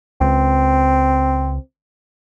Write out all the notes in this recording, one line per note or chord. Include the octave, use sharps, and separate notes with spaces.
C#2 C4